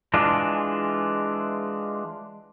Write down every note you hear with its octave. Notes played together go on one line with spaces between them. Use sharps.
E3 G#3 D4 F4